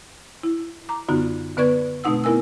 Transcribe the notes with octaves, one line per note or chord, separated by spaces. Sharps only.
E4
A#5 D6
F#2 D3 B3 D#4 F4 F#4
D3 B3 B4 D5 C#6 G#6
B2 A3 C4 D#4 F#5 E6
B3 E4 A#4 G#5 E6